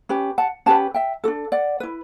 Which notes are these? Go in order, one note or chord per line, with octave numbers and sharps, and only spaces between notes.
C#4 G4 B4
F#5 A5
C#4 G4 B4 F#5 A5
E5 G5
D4 F#4 A4
D5 F#5
E4 B4